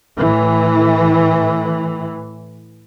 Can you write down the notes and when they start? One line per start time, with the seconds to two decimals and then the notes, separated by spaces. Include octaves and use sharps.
0.16 A2 E3